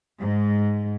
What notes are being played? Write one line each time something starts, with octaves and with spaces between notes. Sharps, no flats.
G#2